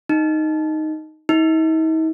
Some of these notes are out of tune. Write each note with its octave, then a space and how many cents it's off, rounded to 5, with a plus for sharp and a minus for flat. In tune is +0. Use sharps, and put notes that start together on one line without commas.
D#4 +0
D#4 +45